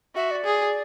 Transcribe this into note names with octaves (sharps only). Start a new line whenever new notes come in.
F#4 E5
D5
G#4